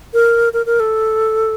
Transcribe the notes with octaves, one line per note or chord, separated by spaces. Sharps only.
A#4
A#4
A#4
A4